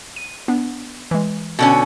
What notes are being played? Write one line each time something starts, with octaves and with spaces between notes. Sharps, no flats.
D#7
B3 D4
E3 G#3
B2 D3 C#4